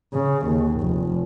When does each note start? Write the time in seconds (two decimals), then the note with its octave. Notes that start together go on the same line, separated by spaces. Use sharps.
0.13 C#3
0.46 D#2
0.81 F1